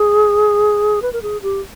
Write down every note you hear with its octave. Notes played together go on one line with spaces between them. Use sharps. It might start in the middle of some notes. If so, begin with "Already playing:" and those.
Already playing: G#4
B4
A#4
G#4
G4